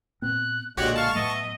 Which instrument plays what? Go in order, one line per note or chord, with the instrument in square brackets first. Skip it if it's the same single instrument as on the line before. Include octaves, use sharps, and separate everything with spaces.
[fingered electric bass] A#2 B3 C4 [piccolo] F#6
[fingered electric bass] B1 [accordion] A#2 D3 G#3 [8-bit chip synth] F#4 G4 C#5 [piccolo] F#5
[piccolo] F5 [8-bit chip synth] A5 C#6
[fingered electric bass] A2 F#3 A3 [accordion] B3 E5 [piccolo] D#5